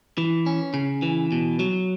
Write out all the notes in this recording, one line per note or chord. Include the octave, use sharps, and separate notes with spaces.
E3
C#4
C#3
E3
B2
F#3